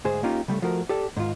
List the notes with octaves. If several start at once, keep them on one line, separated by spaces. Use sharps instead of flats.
D2 G#2 G#4 C5
A#3 C#4 D#4 F4 G4
C#3 G3 A3
F3 A3 F#4 A#4
G4 A4 D5
G#2 D#3 F4